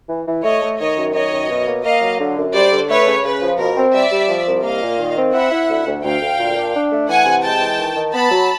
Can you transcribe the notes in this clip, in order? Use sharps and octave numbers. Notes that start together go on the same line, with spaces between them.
E3
E3
A3 C#5 D#5
A3
D#3 C#5 D#5
F#2
D#3 C#5 D#5
F#2
B2
A#3
A#3 D#5 F5
F#3
D3
F#2
G3 C5 D5
D3
A3 B4 C#5
C#3
C#3 B4
F3
B2 A#4
C4
G3 D5 E5
G3
F3
C2
A#3 D#5 F5
A#2
D#3
C4
E4 E5 F#5
E4
D2
D2
D2 F5 G5
D2
A#2
D4
D4
A3
E3 F#5 G#5
C3
G#3 G5 A5
E3
D#3
D#3
B3 A5 B5
F#3